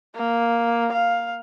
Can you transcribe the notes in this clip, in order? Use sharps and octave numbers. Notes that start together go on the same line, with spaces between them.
A#3
F5